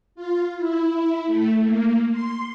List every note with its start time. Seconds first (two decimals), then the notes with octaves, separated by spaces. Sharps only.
0.15 F4
0.57 E4
1.27 A3
1.63 A#3
2.12 C6